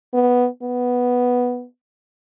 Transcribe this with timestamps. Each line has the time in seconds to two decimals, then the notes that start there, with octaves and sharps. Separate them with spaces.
0.14 B3
0.63 B3